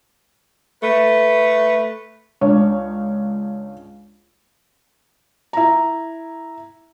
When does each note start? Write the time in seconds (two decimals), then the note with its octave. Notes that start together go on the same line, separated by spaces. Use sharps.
0.83 A3 B4
2.41 C#2 D4 C#5
5.53 E4 A#5